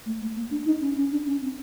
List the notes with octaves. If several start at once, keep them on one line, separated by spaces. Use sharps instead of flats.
A3
A3
A#3
D4
D#4
C#4
C#4
D4
C#4
C4